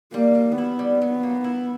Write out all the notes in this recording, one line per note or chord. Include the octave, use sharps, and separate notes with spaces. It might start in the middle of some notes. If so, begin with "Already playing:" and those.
G3 A#3
G3
B3 E4
G3
F#3
A#3
E4